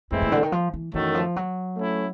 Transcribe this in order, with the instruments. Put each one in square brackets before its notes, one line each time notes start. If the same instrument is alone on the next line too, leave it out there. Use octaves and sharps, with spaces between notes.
[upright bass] F2 [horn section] A2 E3 G#3 C4 E4
[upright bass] A#2
D3
D#3
F3
E3
[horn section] F#2 D#3 F#3 A3 [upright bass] E3
[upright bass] F3
F#3
[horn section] A3 C#4 E4